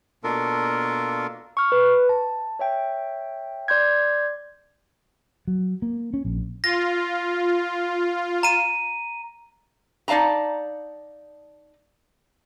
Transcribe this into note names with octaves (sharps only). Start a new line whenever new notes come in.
B2 A#3 D4 F4 A4 A#4
C#6 F6
B4
A5
C#5 E5 G5
D5 C6 G6 G#6
F#3
A#3
C#4
A#1
F4 A#6
A#5 D#7
D#4 D5 F5 A5 A#5